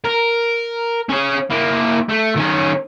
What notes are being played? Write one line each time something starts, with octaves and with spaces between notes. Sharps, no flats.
A#4
C#4 G#4
A#3 E4
A3
D#3 C#4